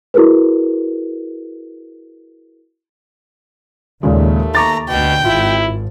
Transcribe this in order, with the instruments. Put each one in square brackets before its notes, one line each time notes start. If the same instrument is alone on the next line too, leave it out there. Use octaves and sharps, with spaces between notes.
[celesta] E4 F#4 G#4 A#4 B4
[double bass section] D#2 [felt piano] A#2 C#3 G#3 [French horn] A3
[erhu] A#5 [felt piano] C#6 D6 A6
[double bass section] D2 [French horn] B2 [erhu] G5
[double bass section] G#1 [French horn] E4 [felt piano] F4